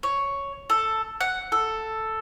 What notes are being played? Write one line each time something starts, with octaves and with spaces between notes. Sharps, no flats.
C#5
A4
F#5
A4